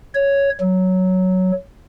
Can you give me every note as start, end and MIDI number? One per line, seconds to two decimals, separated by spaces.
0.15 0.49 73
0.60 1.51 54